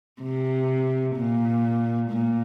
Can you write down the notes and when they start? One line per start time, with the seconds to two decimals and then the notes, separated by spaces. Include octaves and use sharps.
0.22 C3
1.16 A#2
2.10 A#2